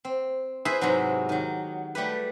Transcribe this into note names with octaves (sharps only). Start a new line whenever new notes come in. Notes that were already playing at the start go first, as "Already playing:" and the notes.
C4
E4 G#4 B4 C5 E5
G#2 C3 F#3
D#3 F#3
G3 A3 G4 B4